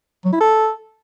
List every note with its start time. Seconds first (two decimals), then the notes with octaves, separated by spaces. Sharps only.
0.25 F#3
0.33 E4
0.40 A4